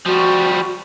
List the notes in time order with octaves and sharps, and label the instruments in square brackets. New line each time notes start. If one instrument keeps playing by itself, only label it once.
[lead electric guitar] F3 G3 [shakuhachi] F#4